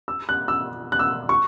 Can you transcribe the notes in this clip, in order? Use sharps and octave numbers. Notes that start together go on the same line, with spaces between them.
E6
F#6
E6
F#6
E6
C#6